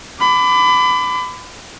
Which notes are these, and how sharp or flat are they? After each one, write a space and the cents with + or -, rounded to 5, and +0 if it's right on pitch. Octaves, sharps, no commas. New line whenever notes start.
B5 +30 D6 +0